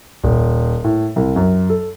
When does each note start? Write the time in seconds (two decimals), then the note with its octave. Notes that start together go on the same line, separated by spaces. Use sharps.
0.23 D#1
0.84 A2
1.16 C2
1.36 F#2
1.70 A4